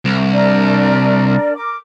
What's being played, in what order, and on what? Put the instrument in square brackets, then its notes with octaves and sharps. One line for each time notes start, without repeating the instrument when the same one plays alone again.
[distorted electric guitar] C2
[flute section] D4 A#4 D5
A#4 D6